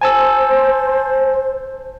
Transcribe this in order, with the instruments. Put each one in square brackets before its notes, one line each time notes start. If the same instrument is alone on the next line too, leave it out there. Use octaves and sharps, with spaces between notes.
[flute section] C5 [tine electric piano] G#5 A5 E6